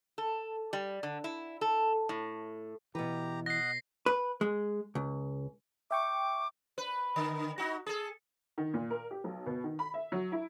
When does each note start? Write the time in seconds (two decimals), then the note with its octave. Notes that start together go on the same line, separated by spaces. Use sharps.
0.18 A4
0.73 G3
1.03 D3
1.24 E4
1.61 A4
2.09 A2
2.95 B2 E3 G4 B4 A#5
3.46 D#5 F#5 A#6 C7
4.06 B4
4.41 G#3
4.95 C#2
5.91 E5 G5 C#6 D6
6.78 B4
7.16 D3
7.58 D#4 F#4
7.86 G#4 A4
8.58 D#3
8.74 A#2
8.90 A#4
9.11 G4
9.24 B1
9.46 B2
9.64 D#3
9.79 B5
9.94 E5
10.12 F#3
10.32 E4